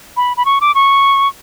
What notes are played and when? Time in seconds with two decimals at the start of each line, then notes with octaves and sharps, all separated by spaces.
0.17 B5
0.37 B5
0.45 C#6
0.61 D6
0.75 C#6